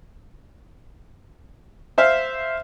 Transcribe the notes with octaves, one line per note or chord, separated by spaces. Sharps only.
C5 E5 F5